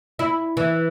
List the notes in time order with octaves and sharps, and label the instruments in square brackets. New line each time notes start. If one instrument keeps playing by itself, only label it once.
[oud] E4
E3